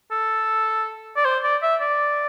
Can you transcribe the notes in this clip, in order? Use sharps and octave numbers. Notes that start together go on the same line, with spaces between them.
A4
D5
C5
D5
E5
D5